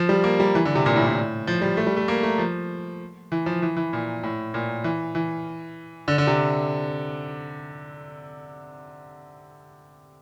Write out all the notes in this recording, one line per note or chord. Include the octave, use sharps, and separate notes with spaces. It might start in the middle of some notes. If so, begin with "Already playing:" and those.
Already playing: F3
G3
A#3
G3
E3
D3
C3
A#2
A2
A2
F3
G3
A3
G3
A3
A#3
A3
F3
E3
F3
E3
E3
A#2
A2
A#2
E3
E3
D3
D3
C3